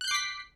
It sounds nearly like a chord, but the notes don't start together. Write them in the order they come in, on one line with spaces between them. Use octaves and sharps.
F#6 G6 C7 D6 B6